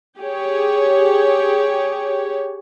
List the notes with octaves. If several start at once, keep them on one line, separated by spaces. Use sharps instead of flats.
G4 G#4 C#5